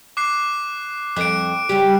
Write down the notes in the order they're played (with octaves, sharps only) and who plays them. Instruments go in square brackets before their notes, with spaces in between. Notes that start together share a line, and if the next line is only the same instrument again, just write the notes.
[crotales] D6 F#6 C7
[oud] F2 [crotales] F#6 D7
[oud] C#3 G3 G4